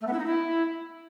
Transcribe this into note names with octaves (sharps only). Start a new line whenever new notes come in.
A3
B3
E4
D#4
E4